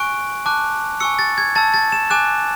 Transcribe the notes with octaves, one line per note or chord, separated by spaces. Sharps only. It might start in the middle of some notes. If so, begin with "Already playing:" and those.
Already playing: G#5 C#6 F#6 D7
A5 D6 F#6
G#5 C#6 E6 C#7
A6
G#6
A5 E6 A6
A6
E7
G#5 D6 F#6 E7